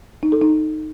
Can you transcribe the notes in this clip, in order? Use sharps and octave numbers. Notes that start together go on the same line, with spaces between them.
D#4
A4
D#4